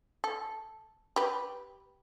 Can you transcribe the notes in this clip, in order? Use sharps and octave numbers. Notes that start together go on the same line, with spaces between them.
A4
G4 B4